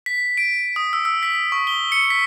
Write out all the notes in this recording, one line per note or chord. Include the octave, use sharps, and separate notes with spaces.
B6
D7
D#6
E6
E6
B6
C#6
G7
C#7
B6